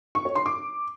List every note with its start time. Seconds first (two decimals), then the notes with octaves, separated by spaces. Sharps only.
0.15 C#6
0.25 C#5
0.35 C6
0.46 D6